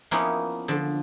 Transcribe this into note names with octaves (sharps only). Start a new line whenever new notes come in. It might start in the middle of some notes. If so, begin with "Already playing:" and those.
F3 A#3 B3 C#4 D#4 E4
D3 F3